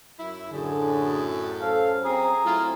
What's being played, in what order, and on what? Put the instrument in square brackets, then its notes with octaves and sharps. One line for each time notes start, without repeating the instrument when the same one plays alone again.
[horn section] F#2 E4
[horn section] F#2 A2 [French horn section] D3 [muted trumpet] G#4
[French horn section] F#3 C#4 C5 [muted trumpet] A4 [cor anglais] F5
[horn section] C4 [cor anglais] G#4 [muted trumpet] A#5
[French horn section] F#3 A3 C4 [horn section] E4 F4